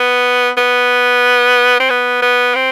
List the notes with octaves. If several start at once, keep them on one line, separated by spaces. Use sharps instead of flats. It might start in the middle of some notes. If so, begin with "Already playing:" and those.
Already playing: B3
B3
C4
B3
B3
C4